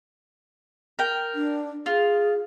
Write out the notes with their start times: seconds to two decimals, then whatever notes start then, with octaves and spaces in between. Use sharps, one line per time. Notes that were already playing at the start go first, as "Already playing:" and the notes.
0.99 A#4 G5
1.35 D4
1.86 F4 G#4